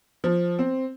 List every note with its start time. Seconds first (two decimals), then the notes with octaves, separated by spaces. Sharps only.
0.24 F3
0.59 C4